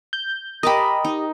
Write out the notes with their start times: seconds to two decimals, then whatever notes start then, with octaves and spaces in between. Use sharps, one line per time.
0.13 G6
0.63 G4 A#4 D#5 A5 B5
1.05 D#4